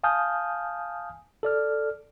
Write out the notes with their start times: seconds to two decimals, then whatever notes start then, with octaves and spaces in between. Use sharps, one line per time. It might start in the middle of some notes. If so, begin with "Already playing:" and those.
0.04 F5 G#5 A5 D#6 F6 G6
1.43 A4 D5 F6